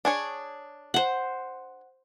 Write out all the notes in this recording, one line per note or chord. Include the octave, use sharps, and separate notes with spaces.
D4 G#4 C#5
C5 F#5